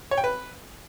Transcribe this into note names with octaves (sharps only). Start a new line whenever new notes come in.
C#5
G5
B4